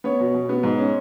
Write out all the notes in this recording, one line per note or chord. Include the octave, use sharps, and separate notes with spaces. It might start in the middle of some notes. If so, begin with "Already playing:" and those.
B3 C#5
B2
B2
B3
G#2
C#4